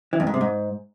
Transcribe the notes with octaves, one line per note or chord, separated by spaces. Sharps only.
E3
F2
G#2
C3
G#2